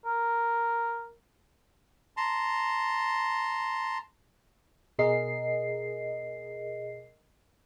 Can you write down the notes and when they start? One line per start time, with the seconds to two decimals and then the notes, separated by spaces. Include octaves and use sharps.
0.05 A#4
2.17 A5 A#5 C6
4.99 B2 G#4 A#4 D#5 C7